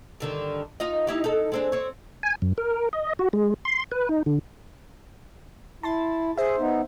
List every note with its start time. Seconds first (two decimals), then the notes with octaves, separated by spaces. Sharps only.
0.20 G2 D3 D#3
0.80 D#4 F4 D#5
1.07 D#4 E4 G4
1.24 D#4 A4
1.52 G#3 C4 D4
1.72 C4 C#5
2.23 G#5
2.42 F#2
2.58 A#4
2.93 D#5
3.19 F#4
3.33 G#3
3.65 C6
3.91 B4
4.09 D#4
4.26 D3
5.83 E4 A5 C6 A6
6.37 G#4 C5 E5
6.58 B3 D#4